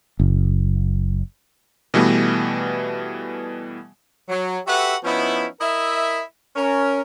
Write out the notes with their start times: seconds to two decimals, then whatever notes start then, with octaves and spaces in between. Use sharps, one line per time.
0.19 F#1
1.94 B2 E3 G3 A3 B3
4.29 F#3
4.66 F#4 G4 A4 B4 E5 F#5
5.03 F3 B3 C#4 D#4 E4
5.61 E4 A#4 D#5 E5
6.56 C#4 A#4